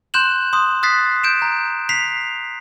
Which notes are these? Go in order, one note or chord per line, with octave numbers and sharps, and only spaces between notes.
C6 F#6 G6 E7 F#7
C6 D#6
D#6 F#6 A6 B6 C7
G6 D7 E7
A#5
B6 C7 F7